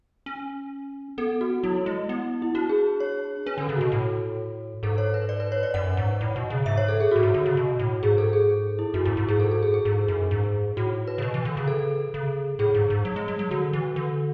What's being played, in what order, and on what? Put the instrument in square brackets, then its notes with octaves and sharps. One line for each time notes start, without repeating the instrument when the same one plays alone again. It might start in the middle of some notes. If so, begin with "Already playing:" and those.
[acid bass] C#4
[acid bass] B3 [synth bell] A4
[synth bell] F#4
[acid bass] F#3 [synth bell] E4
[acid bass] G#3
B3
[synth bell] E4
[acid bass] D4 [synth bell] F#4
[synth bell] G#4
C#5
[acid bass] C#4 [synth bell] B4
[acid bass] D3 [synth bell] A4
[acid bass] C#3
[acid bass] B2 [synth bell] F#4
[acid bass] A2
[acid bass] G#2 [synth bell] A4
[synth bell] C#5
B4
D5
B4
C#5
D5
[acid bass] F#2 [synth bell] F#5
[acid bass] G#2
A2
B2
C#3
[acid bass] G#2 [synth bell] E5
[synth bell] C#5
A4
G#4
[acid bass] A2 [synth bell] F#4
[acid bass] G#2
D3
C#3
B2
A2
[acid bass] G#2 [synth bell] G#4
[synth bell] A4
G#4
E4
[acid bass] F#2 [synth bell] F#4
[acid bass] G#2 [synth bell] E4
[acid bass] G#2 [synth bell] F#4
[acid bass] G#2 [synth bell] G#4
[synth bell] A4
A4
G#4
G#4
[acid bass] G#2
F#2
G#2
[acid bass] A2 [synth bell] F#4
[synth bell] B4
[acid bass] C#3
B2
E3
D3
C#3
[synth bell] A4
[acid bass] C#3
[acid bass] A2 [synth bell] G#4
[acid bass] G#2
G#2
F#3
G#3
F#3
F#3
[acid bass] D3 [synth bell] F#4
[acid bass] E3
D3